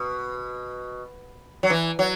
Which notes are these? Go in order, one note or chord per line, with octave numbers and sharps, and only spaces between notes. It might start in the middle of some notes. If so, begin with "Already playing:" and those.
Already playing: B2
F#3
E3
F#3